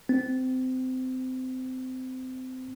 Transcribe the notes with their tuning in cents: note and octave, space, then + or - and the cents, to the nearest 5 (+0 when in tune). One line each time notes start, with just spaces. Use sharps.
C4 -25